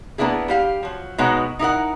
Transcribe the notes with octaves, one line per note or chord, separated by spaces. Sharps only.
A#3 B3 D4 E4 G#4
G3 G4 F5
F3 F#3
B2 G#3 D#4 C#5 F#5
D#4 E4 A#4 F#5